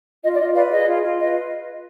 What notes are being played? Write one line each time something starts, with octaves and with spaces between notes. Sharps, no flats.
F4 D#5
D5
F4 D#5
B4 D5 F5
G#4 D#5
F4
F4
B4 D#5